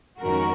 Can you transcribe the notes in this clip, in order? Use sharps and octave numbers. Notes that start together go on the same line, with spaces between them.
F2 D#3 G#3 C#4 F#4 A#4